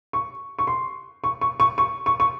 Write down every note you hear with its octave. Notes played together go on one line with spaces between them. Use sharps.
C#6
C#6
C6
C#6
C#6
C#6
C#6
C#6
C#6